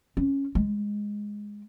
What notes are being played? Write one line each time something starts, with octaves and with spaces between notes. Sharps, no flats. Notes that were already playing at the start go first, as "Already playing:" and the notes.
C#4
G#3